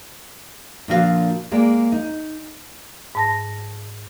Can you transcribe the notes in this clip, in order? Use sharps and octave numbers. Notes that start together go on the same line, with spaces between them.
A#2 D3 F3 F#4 A4 F5
G#3 A#3 D5
D#4
G#2 A5 A#6